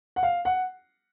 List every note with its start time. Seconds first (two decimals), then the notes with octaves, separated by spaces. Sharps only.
0.16 F#5
0.23 F5
0.45 F#5